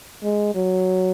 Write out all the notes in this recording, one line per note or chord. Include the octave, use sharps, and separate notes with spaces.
G#3
F#3